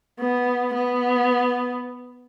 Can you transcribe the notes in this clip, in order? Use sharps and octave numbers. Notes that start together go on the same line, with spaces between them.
B3
B3